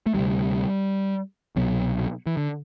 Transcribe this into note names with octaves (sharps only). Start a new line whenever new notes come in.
A3
D2 C3 G3
C2 B2 F#3
E3
D3